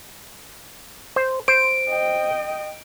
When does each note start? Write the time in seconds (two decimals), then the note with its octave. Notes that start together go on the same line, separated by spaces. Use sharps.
1.16 C5
1.48 C5 D7
1.88 D#5 G5